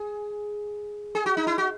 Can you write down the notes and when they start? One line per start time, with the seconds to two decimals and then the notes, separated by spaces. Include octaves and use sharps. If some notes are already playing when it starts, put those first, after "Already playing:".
Already playing: G#4
1.15 G#4
1.26 F#4
1.37 D#4
1.47 E4
1.58 F#4